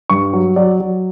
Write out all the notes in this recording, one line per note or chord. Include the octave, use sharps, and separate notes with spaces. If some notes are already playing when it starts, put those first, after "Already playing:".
G2 C#6
F#3
F#3 D5
F#3